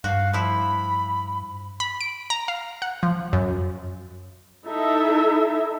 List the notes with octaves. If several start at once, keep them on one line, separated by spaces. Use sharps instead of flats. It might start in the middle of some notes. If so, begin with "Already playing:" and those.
G2 F#4 F5
F3 E4 B5
B5
D7
A#5
F5
F#5
F3
F#2
D#4 E4 A4 E5